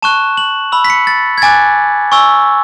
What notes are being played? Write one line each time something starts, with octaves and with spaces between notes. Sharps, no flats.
A5 C#6 F#6 E7
F#7
B5 E6 F#7
B6
C#7
A6
G#6
G#5 D6 F#6 A6
G#5 C#6 E6